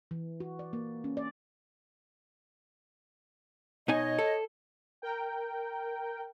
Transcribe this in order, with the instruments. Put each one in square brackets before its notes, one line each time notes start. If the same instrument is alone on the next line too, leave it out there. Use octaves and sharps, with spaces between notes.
[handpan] E3
F#4
D5
A#3
C#4
D5
[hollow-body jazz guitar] B2 D#4 G#5 [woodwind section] C#5 D#5
[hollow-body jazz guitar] A4
[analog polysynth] A#4 G5